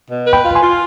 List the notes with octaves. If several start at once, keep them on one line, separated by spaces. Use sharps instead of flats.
B2
B4
G5 B5
F4
G#5 C6
F4